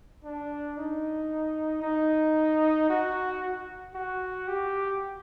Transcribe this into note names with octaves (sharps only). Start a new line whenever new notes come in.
D4
D#4
D#4
F#4
F#4
G4